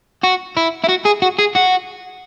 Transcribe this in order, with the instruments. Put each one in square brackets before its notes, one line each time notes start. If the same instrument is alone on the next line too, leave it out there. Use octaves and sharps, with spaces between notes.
[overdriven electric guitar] F#4
E4
E4
F#4
G#4
F#4
G#4
F#4